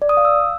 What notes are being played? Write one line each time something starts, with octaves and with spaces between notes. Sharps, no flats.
D5
D#6
F5
E6